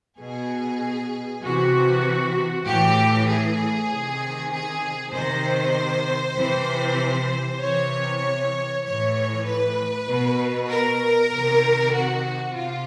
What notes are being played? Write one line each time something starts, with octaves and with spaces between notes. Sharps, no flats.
B2 G#4
C3 E3 F#4
A2 E3 G4
G#4
C3 D#3
G#4
C3 D#3 C5
C3 E3
C3 E3 C#5
A2 E3 C#5
B4
B2
A#4
C3 D#3
F#4
C3 F4